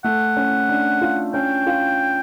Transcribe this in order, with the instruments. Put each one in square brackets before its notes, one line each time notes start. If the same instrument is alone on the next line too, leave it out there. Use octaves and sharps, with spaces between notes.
[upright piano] A3 [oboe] F#5
[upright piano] C#4
D4
F4
[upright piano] C#4 [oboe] G5
[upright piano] F4